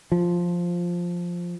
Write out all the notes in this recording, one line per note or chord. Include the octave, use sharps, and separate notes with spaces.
F3